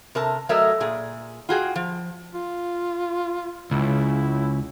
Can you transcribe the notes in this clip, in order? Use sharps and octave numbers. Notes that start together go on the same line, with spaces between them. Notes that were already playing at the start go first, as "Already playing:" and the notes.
C3 A#4 A5
F#3 A3 A#4 C#5 D#5 E5
A#2 G#4
F4 F#4 G#4 G5
F3
F4
C#2 E4